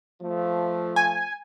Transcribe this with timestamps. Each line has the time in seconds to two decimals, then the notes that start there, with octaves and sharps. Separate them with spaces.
0.22 F3 A3
0.96 G#5